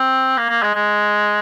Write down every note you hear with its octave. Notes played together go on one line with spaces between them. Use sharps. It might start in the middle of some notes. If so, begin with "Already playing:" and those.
Already playing: C4
A#3
A#3
G#3
G#3